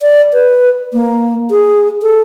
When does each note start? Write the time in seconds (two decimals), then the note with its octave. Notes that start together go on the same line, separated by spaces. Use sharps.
0.02 D5
0.33 B4
0.93 A#3
1.51 G#4
2.02 A4